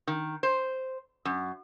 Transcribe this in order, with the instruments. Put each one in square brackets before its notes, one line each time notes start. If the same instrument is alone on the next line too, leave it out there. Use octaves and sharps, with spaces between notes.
[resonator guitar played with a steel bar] D#3
C5
F#2